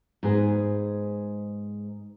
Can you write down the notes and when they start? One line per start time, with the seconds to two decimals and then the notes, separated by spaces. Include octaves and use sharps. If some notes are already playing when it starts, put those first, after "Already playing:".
0.23 G#2 B3 G#4